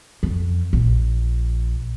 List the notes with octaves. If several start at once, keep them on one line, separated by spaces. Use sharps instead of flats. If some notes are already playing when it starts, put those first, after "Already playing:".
F2
A#1